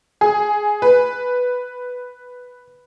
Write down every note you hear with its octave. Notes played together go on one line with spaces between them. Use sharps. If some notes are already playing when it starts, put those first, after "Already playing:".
G#4
B4